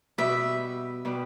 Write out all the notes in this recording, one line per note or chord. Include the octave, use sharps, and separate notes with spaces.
B2 G3 B3 G4 E5
B2 G3 B3 G4